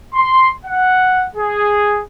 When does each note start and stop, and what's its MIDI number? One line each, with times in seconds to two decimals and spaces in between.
0.15 0.52 84
0.66 1.27 78
1.36 2.00 68